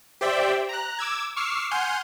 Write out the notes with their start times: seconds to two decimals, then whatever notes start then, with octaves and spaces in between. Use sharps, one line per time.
0.21 G4 C5 D5 E5 G5
0.69 A#5 F#6
0.99 D6 E6 G#6
1.36 C#6 D6 E6 F6 C7
1.71 F#5 G#5 C6 F6 G6